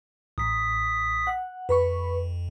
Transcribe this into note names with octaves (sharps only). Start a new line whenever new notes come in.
A1 D#6 B6
F#5
F2 B4 B5 C#6